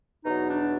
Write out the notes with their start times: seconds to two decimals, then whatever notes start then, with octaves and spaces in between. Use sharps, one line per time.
0.24 E2 B2 F#3 D#4
0.48 D4